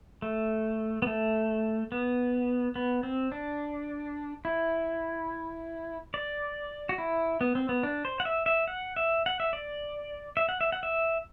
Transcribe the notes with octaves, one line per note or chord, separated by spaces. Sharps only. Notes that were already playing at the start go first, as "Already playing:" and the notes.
A3
B3
A3
B3
B3
C4
D4
E4
D5
F#4
E4
B3
C4
B3
D4
C5
F#5
E5
E5
F#5
E5
F#5
E5
D5
E5
F#5
E5
F#5
E5